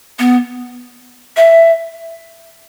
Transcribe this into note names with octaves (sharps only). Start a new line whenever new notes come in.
B3
E5